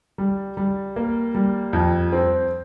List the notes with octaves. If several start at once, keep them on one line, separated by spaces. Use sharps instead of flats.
G3
G3
A#3
G3
F2
C4